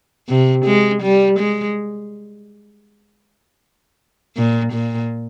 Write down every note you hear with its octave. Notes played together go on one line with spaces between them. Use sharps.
C3
G#3
G3
G#3
A#2
A#2